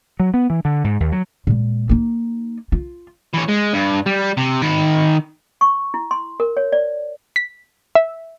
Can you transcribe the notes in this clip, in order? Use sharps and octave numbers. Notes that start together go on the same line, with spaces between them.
F#3
B3
E3
D3
G#2
D#2
F#3
A#2 G#3
A#3 D#4
F4
E3 C#5
G#3
G2
G3
C3
D#3 B5
C#6
E4
C6
A#4
C#5
D5
B6
E5